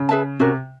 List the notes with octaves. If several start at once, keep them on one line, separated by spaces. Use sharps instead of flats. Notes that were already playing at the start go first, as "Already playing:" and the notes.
Already playing: C#3
G#4 B4 E5 A5
C3 C#4 F#4 A#4